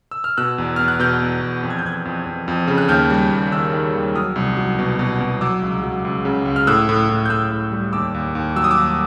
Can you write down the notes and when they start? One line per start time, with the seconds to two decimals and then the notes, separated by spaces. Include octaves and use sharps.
0.11 E6
0.24 F6
0.37 B2 E6 F#6
0.58 E2
0.76 E2 F6
0.88 F#6
1.00 B2 F6 G6
1.22 E2
1.42 E2
1.63 F2
1.70 G#6
1.79 G6
1.84 F2 F#6 G#6
2.05 F2
2.26 F2
2.48 F2
2.68 C#3
2.78 F#6
2.89 D#2 F6 G6
3.10 G3
3.31 D#2
3.52 D#3 E6 F#6
3.73 D#3
3.94 D#2
4.16 F#3 D#6 F6
4.36 C2
4.57 F#3
4.79 B2
4.99 B2
5.20 B2
5.41 F#3 D6 E6
5.62 C#2
5.83 F#3
6.05 C#2
6.25 C#3
6.46 C#2
6.56 F6
6.67 A2 E6 F#6
6.89 A2
7.10 A2
7.25 G6
7.29 A2 E6 F#6
7.51 A2
7.72 G3
7.93 D#2 D6 E6
8.14 D#2
8.35 D#2
8.56 F#3 E6
8.64 D#6
8.71 D6 E6
8.78 D#2